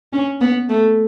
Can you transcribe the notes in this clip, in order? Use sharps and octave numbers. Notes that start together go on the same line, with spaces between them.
C#4
B3
A3